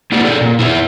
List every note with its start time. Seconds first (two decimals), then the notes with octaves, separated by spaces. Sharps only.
0.12 A#3 E4 F#4 G4 D5
0.25 G#4 A4 D5
0.41 A#2
0.59 E4 G#4 C#5 E5